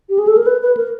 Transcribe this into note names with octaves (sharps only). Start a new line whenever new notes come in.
G4
G#4
A4
A#4
B4
B4
A#4